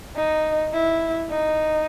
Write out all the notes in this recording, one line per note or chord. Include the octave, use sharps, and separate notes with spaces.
D#4
E4
D#4